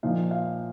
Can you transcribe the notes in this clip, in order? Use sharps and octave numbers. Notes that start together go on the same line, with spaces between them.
A#2 F3 D#4 F5
F5